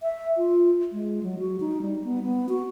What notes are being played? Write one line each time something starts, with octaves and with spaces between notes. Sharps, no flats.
E5
F4
G#3
F#3
F#4
D#4
G3
B3
B3
F#4